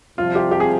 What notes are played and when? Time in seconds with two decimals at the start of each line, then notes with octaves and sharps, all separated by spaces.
0.18 C2 C3 F3 F4
0.35 G4
0.51 G4
0.60 G#4